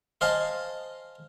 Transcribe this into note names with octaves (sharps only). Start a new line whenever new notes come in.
C5 D#5 F5 G#5 A5